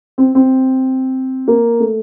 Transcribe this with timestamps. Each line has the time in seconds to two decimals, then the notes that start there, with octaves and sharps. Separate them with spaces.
0.18 C4
0.35 C4
1.48 A#3
1.80 A3